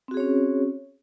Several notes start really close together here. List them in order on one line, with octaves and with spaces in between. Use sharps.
C4 F#4 G#4 C#5 C#4